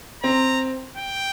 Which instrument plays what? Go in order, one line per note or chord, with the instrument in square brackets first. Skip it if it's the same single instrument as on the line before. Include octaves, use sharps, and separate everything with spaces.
[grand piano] C4 [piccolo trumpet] A#5
[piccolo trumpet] G5